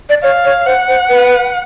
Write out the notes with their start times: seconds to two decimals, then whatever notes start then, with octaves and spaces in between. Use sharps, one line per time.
0.09 D5
0.23 C#5 F5
0.45 C#5
0.66 C5 F#5
0.88 C5
1.09 B4